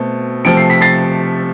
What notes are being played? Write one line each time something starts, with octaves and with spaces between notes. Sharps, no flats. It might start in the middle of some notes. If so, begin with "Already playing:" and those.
Already playing: B2 A3 C4
C3 F3 A3 C4 D7
C7
B6
A6 C7